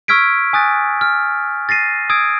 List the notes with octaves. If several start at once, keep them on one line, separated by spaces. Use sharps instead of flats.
C#6 E6 F6 G#6 B6 D7
G#5 D#6 F#6 A6
F6
A6 A#6 C7 D#7
D#6 E6 G#6 D7